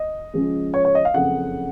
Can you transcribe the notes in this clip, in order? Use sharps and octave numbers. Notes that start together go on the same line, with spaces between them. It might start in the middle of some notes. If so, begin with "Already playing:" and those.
Already playing: D#5
C#2 C#3 F3 G#3
C#5
C#5
D#5
F5
F#1 F2 C#3 F#5